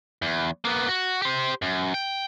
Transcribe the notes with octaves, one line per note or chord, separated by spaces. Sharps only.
E2
A#3 B3
F#4
G4 C5
F#2
G5